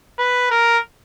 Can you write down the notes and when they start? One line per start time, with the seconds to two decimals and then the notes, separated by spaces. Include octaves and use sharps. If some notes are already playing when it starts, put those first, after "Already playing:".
0.18 B4
0.51 A#4